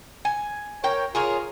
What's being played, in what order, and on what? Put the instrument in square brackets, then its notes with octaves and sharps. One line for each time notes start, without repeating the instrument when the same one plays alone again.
[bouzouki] G#5
[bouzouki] A#4 G5 [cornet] C#5
[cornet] F4 [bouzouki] G#4 A#4 C#5